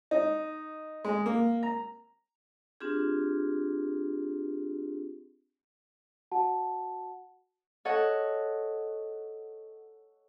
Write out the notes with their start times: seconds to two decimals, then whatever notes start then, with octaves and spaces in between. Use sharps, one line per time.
0.11 D#4
1.05 G#3
1.26 A#3
1.63 A#5
2.81 C4 D4 F4 G4 G#4
6.32 F#4 F#5 A5
7.85 A4 C#5 D#5 F#5